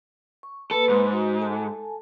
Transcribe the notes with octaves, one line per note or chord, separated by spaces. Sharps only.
C#6
A#3 A4 B4 B5
G#2
F#4
A4 G#5 A5